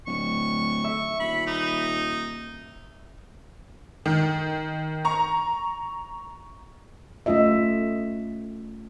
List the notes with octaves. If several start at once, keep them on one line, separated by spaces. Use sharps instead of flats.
D1 C#6
E5
D#1 B5
D#4
D#3
A#5 C#6
A3 C#4 F4 D#5 E5